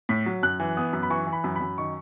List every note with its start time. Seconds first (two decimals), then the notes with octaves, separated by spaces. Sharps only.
0.09 A2 B6
0.26 F#3
0.43 F#2 F#6
0.60 E3
0.77 B3 D#6
0.93 F#2
1.03 B5
1.10 E3 C#6
1.27 E3
1.33 B5
1.44 F#2
1.56 F#2 B5
1.78 D#3 C#6